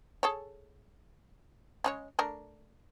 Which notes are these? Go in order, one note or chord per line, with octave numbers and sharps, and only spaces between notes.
G#4 A4 C#5
C#3 G#3 C#5
A3 D4 A#4